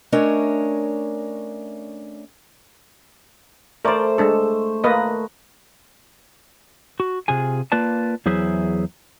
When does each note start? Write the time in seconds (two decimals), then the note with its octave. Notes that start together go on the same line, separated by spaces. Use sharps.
0.12 A3 C#4 D4 A#4 C#5 D#5
3.85 A3 A#4 C5 D5
4.18 G#3 D4 A4
4.84 A#3 B4 D#5
7.00 F#4
7.28 C3 F4 G#4 G#5
7.72 A#3 F4 B4 D5 A5
8.26 E2 F#3 E4 G#4 C5 E5